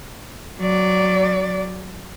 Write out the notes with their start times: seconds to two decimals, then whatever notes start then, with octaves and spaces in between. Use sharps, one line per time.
0.61 F#3 D5